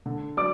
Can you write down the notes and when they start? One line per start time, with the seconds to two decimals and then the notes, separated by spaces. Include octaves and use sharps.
0.06 D3
0.37 F#3 D5 D6